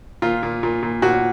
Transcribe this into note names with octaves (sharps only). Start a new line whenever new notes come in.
A#2 F4
A#2
A#2
A#2
A#2 F#4